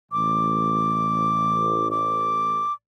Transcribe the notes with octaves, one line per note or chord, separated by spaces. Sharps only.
A1 D6
D6